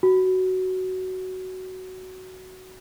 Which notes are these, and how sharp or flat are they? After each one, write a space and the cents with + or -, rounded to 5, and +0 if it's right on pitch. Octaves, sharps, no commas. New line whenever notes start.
F#4 +10